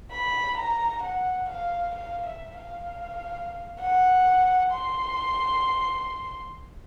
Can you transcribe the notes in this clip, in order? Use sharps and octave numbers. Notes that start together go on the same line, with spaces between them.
B5
A#5
F#5
F5
F5
E5
F5
F#5
C6